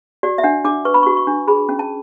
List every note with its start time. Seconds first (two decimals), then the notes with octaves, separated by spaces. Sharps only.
0.23 F#4 D5
0.38 E5
0.43 D4 F#5
0.64 D4 D6
0.85 B4 C#6
0.94 B5
1.03 F#4 C#6
1.17 C#6
1.27 D4
1.48 G#4 B5
1.69 C#4
1.79 A5